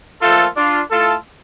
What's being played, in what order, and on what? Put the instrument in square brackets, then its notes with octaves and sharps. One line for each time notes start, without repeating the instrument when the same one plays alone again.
[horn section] A#2 F3 A3 F4 A4
D4 F4
A2 A3 F4 A4